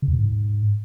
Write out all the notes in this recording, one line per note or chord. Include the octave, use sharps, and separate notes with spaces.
C#3
E2
B2
G#2